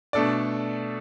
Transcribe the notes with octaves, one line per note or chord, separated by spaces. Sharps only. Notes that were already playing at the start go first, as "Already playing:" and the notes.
B2 A3 D4 A4 D5